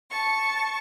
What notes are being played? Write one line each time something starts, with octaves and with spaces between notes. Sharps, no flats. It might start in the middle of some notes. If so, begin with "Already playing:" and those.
A5 C#6